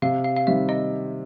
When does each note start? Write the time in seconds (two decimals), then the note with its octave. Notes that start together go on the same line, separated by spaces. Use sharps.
0.02 C3 F5
0.24 F5
0.36 F5
0.47 D#3 G3 C4 E5
0.69 D#5